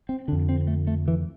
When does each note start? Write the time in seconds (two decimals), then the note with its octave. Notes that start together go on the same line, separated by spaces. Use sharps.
0.09 C4
0.28 D3 D4
0.32 F2
0.49 C4
0.67 A3
0.87 A3
1.08 E3